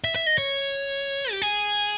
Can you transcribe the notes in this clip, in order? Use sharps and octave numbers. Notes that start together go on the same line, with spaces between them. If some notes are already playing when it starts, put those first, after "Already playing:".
E5
E5
D#5
C#5
G4
G#4